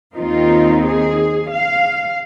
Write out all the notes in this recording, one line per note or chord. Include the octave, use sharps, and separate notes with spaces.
D#2 D#3 C4 D#4 F4
G#4
F5